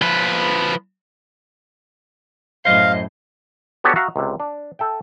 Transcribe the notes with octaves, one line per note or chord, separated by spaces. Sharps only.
F3 B4
F#2 A2 C5 D#5 F5
B3 D4 F#4 G4 A4 C#5
F#4 E5 F5 A#5
C#2 C3
D4
A4 E5 G5